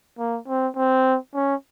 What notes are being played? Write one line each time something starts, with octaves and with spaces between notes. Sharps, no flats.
A#3
C4
C4
C#4